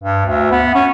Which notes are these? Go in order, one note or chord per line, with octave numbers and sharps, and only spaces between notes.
G2
D2
B3
C#4